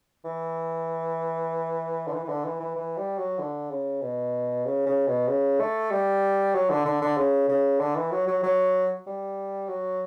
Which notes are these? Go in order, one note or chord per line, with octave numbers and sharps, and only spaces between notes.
E3
D3
E3
E3
D3
E3
E3
E3
G3
F#3
D3
C#3
B2
C#3
C#3
B2
C#3
A3
G3
F#3
D3
D3
D3
C#3
C#3
D3
E3
F#3
F#3
F#3
G3
F#3